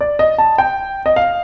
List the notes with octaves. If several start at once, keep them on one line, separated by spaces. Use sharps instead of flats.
D5
D#5
A5
G5
D#5
F5